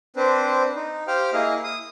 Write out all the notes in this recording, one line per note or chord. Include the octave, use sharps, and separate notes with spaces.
C4 D4 B4 C5
D#4
G4 C5 F5 G5 F6
A#3 E4 G#4 D#5 F5
D#6